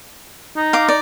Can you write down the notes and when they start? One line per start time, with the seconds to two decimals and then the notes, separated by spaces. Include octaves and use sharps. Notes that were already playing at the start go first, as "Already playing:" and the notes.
0.56 D#4
0.73 F5 D6
0.88 D5